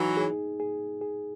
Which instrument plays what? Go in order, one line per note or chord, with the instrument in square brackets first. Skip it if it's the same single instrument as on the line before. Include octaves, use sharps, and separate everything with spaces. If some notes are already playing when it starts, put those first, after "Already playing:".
Already playing: [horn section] E3 F#3 [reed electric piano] D#4
[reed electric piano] G#4
G#4
G#4